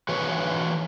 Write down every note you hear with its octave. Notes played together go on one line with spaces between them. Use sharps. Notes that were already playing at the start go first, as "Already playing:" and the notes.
E3 F#4 B4 C#5